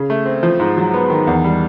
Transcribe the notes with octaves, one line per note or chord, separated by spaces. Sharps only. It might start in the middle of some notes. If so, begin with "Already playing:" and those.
Already playing: C#3
A3
C4
F3
G#2
F#3
B3
D#3
E2
G3